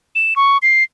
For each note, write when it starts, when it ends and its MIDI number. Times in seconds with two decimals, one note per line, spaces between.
0.15 0.34 100
0.36 0.58 85
0.62 0.83 96